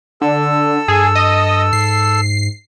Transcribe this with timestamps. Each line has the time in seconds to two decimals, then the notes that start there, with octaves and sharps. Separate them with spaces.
0.21 D3 A4 E6
0.88 G2 G#4
1.15 D#5
1.73 G#2 C7